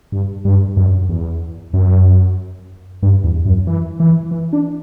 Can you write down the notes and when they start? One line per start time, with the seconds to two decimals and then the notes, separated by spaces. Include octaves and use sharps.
0.12 G2
0.45 G2
0.77 F#2
1.09 E2
1.73 F#2
3.03 G2
3.24 E2
3.46 F#2
3.67 E3
4.00 E3
4.31 E3
4.53 D4